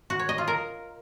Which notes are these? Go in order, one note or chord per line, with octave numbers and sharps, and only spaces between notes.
F#4
C#5
D#5
F4
A#4